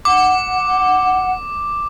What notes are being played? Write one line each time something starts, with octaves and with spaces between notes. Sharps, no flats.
F#5 D6